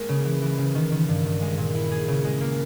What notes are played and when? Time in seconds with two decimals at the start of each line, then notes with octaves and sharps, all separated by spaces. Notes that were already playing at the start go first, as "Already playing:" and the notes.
Already playing: G#3 A#3 G#4
0.09 C#3
0.25 E3
0.42 E3
0.58 C#3
0.75 D#3
0.92 D#3
1.09 G2
1.25 G2
1.41 G#3
1.58 A#2
1.75 E4
1.91 G#4
2.08 C#3
2.25 G#3
2.41 A#3